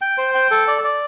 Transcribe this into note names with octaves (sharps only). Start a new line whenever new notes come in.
G5
C5
G5
A4
D5
D5